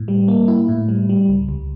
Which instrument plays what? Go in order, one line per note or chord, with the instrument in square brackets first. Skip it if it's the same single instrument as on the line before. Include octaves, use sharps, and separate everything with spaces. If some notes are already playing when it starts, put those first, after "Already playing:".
Already playing: [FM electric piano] A2
G3
A#3
E4
A2
G3
G3
C#2
C#2